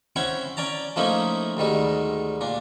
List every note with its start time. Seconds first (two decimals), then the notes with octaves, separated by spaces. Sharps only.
0.16 C4 C#4 E4 C5 C#5 F#5
0.57 C#4 D5 A5 A#5
0.96 F3 A3 A#3 C#4 D#4 E4
1.57 D2 G#2 D#3 G3
2.41 A#2 D4